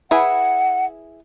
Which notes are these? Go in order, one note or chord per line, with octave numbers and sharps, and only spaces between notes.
E4 G#4 B4 F#5